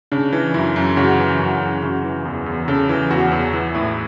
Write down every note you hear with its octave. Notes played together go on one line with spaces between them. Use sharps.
C#3 D4
E3
F#2 E4
F#2
C#3 F#4
E3
F#2 F#4
F#2
C#3 F#4
E3
E2
E2
C#3 A4
E3
E2 F#4
E2
E3
A2 E4